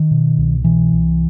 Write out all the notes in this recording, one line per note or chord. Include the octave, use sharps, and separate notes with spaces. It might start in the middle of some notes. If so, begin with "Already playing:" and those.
Already playing: D#3
B2
C2
B2 E3
C2